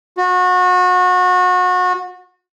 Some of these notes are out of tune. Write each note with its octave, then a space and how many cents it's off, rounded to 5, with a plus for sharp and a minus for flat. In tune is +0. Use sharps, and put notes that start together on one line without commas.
F#4 -30